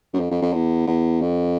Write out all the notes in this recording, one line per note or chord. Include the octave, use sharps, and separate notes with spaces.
F#2
F2
F2
F2
E2
E2
F2